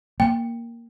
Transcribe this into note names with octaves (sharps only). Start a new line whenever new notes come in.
A#3 G5